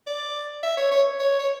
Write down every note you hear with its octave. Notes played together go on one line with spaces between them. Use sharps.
D5
E5
C#5
C#5
C#5
C#5